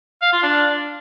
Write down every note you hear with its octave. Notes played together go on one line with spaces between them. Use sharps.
F5
F4
D4